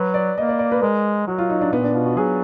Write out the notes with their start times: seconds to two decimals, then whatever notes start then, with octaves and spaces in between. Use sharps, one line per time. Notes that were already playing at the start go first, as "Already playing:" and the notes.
Already playing: F#3 B4
0.14 D5
0.38 A#3 D#5
0.49 D5
0.59 D5
0.72 B4
0.82 G#3 A#4
1.27 F#3 F#4
1.38 F4
1.50 D#4
1.61 D4
1.72 A#2 B3
1.84 D4
1.94 B2 F4
2.06 F#4
2.17 F#3 G#4